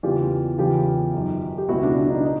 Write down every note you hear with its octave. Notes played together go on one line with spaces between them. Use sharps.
E2 C#3 E3 F4 G4
E2 C#3 E3 F4 G4
F#2 D#3
G4
C#2 B2 E4 F#4
D4 E4
D4
D#4
D4
D#4